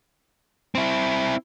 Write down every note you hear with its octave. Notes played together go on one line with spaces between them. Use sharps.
C4 E4